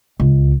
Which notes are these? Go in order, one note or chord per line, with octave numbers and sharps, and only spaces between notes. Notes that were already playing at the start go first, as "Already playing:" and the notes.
C#2